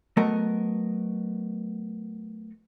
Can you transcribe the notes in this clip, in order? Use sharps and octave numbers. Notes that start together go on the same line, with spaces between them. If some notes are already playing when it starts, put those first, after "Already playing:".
F#3 A3 B3 A4 A#4 D#5